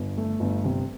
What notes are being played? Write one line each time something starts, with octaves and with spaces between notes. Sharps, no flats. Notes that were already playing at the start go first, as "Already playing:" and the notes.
Already playing: G1
A3
G1
C3